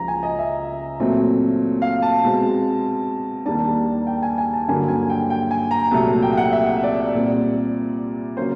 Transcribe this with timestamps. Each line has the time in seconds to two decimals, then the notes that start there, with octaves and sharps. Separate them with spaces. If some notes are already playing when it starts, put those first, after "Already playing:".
Already playing: C#2 C#3 F3 A#5
0.08 G#5
0.23 D#5
0.39 E5
1.00 A#2 F#3 A3 C4
1.82 F5
2.02 A5
2.23 B2 G#3 C4
3.45 D#2 D#3 G3 A#3 D4 A5
4.07 G5
4.23 G#5
4.38 G#5
4.53 A5
4.68 G2 D3 F#3 A#3 G#5
4.88 G#5
5.10 G5
5.30 G5
5.51 G#5
5.71 A#5
5.91 C2 A#2 F#3 A3 A5
6.22 G5
6.33 G5
6.37 F#5
6.53 E5
6.84 D5
7.14 A#2 G3 C4
8.37 C#3 F#3 A#3 C#4 C5